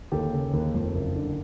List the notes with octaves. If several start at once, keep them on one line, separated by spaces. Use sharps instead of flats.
D#2 G4 A4
C#3
D#2
F2
F#1
D3